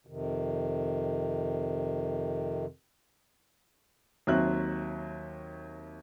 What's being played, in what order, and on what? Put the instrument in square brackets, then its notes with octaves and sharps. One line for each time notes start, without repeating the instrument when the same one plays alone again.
[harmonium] F2 C3 D#3
[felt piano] D#2 F#3 C4 E5 F#6